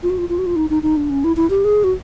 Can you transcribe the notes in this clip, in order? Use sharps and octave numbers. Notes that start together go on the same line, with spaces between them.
F4
F#4
F4
F4
F#4
F4
D#4
D#4
D#4
D4
C#4
E4
E4
G4
G#4
F#4